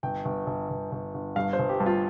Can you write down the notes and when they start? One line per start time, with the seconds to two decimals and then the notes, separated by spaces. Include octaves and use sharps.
0.03 G1 G5
0.25 G1
0.47 G1
0.70 G1
0.92 G1
1.14 G1
1.36 G2 F5
1.53 C5
1.59 G1
1.69 G4
1.80 G2
1.86 F4